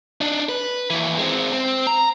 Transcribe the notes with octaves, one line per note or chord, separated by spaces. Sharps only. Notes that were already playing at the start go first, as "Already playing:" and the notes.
D4 D#4
B4
D#2 E3
G#3 C4
C4
A#5